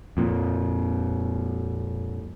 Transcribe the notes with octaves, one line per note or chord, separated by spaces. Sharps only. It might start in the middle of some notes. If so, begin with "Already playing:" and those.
F2 A#2